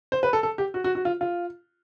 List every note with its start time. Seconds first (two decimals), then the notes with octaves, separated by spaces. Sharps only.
0.12 C5
0.23 B4
0.33 A4
0.43 A4
0.58 G4
0.74 F#4
0.84 F#4
0.95 F#4
1.05 F4
1.21 F4